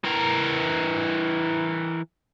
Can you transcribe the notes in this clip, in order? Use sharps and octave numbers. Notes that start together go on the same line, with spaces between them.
E3 A#4